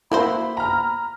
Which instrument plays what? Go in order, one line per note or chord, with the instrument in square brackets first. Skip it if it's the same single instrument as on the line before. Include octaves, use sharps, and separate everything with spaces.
[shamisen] A#3 F#4 C5 [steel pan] E4 [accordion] B5
[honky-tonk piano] A#5 F6